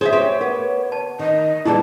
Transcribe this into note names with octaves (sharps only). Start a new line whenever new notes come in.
G#4 C5 C#5 E5
G4 C5 C#5
B3 A#4
A5
D#3 D#5
A#2 E3 G3 E4 G#4 D5 A5